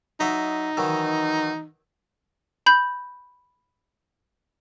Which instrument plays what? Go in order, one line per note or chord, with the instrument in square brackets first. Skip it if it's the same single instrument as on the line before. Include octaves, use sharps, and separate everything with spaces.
[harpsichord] F#3 D#5 E5 [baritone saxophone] D#4
[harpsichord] D#3 E3 F#3
[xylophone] B5 G6